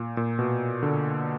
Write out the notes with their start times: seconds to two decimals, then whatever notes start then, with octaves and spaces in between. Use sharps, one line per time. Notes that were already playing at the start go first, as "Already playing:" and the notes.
Already playing: A#2
0.17 A#2
0.39 B2
0.83 D3